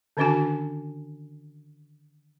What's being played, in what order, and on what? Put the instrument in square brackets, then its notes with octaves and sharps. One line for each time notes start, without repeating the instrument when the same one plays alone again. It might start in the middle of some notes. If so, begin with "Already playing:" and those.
[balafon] D3 D#3 C#4 D4 F#4 G#5